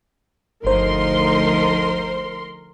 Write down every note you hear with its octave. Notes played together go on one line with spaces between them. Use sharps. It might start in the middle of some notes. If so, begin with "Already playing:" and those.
G1 D2 F3 D#4 A#4 C5 C6